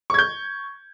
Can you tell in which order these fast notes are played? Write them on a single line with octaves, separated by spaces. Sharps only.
C#6 G#6 G6